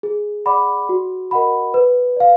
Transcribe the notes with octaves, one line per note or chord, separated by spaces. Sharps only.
G#4
D5 F#5 B5 D6
F#4
A#4 D#5 F#5 B5
B4
D5 F5